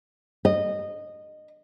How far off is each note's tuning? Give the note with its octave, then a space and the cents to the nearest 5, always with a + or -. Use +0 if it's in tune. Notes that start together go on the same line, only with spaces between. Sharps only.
D#5 -15